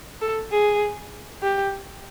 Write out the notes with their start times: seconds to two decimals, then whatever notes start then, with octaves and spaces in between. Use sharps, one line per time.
0.22 A4
0.51 G#4
1.43 G4